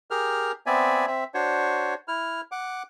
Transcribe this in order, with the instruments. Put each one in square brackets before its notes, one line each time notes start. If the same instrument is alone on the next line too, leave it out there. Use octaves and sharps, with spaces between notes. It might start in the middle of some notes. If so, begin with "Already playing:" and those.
[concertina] G4 G#4 A#4 F6
B3 C4 D5 E5 G#5
C4 E5
D4 F#4 C5 C#5
E4 F6
F#5 D6